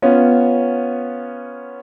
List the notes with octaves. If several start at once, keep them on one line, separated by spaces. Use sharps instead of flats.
B3 C#4 F4